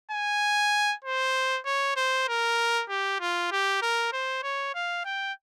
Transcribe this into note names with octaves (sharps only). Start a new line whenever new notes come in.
G#5
C5
C#5
C5
A#4
G4
F4
G4
A#4
C5
C#5
F5
G5